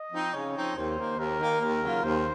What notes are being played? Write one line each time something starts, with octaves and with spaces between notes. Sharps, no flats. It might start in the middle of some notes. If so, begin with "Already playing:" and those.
Already playing: D#5
F3 C4 D#4
C#3 C#5
F3 C4 D#4
D#2 C5
D#3 A#3
D#2 A#4
D#3 A#3
D#2 A#4
C#3 F#3 A#3 F4
D#2 C5